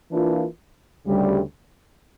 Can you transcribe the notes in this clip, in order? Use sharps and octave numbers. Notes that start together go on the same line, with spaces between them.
E3 A#3 D4 F4
D2 C#3 G3